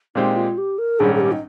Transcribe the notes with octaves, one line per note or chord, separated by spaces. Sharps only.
A#2 G#3 C4 D#4 G4
F4
G4
A#4
A#1 G#2 D#3 G3 C#4 G#4
G#4
G4
D#4